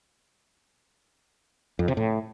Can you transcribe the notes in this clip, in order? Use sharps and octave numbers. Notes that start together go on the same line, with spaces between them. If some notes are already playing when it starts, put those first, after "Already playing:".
F2
C3
A2